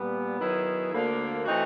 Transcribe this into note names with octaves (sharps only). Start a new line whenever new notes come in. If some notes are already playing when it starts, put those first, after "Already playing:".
Already playing: A#2 G3 B3
D#3 F#3 B3 E4 G#4
D2 D3 F3 A#3 D4
E3 A3 C4 D#4 F#4